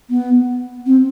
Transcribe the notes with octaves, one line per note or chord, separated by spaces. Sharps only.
B3
C4